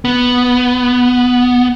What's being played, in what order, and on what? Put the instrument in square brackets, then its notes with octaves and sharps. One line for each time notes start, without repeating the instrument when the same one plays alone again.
[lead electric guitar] B3